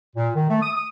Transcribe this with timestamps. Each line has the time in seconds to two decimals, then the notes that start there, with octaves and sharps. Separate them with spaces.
0.16 A#2
0.35 D#3
0.49 A3
0.62 D#6
0.74 D#6